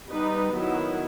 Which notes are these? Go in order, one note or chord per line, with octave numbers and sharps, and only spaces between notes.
G3 B3 D#4 B4
D#3 F#3 B3 E4